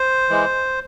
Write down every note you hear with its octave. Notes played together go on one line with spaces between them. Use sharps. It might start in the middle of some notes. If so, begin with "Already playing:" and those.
Already playing: C5
E3 G#3